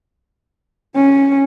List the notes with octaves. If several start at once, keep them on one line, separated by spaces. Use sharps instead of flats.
C#4